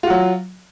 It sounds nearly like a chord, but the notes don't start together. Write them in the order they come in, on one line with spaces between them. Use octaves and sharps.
F4 F#4 F#3